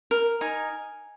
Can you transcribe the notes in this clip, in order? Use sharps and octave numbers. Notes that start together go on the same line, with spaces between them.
A#4
D#4 G#5